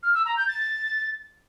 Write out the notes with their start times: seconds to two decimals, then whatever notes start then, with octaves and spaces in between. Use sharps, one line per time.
0.03 F6
0.14 E6
0.26 A#5
0.37 G6
0.48 A6